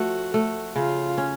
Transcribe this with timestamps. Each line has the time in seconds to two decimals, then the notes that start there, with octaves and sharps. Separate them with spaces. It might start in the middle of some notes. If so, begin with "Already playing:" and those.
Already playing: F3 A3 F#4
0.34 A3
0.76 C#3 F4
1.18 C#4